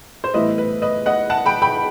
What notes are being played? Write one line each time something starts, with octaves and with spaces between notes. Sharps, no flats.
C5
A2 E3 G3 B3 E4 B4 D#5
B4
B4 D#5
D#5 F#5
F#5 A5
G5 B5
G5 B5